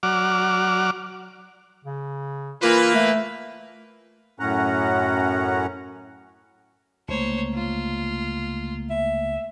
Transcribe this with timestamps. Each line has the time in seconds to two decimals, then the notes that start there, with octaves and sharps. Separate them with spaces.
0.03 F#3 D5 F#5 D6 F6
1.85 C#3
2.62 E3 A#3 F4 B4
2.95 A3
4.40 F#2 A2 C#4 F#5 A#5
7.08 C#2 C3 A3 A#3 C5 C#5
7.54 F4
8.90 E5